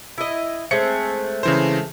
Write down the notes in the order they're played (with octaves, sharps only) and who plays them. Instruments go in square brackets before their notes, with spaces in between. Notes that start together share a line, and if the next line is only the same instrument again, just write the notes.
[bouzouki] E4 D#5
[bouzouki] G#3 A3 C4 [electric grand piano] C#7
[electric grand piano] C#3 E3 C5